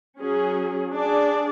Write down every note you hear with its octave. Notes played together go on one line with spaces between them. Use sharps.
F#3 C#4 G#4
D4 G#4 D5